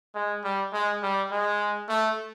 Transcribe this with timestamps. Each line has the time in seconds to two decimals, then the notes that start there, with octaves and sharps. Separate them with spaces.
0.15 G#3
0.44 G3
0.73 G#3
1.03 G3
1.32 G#3
1.89 A3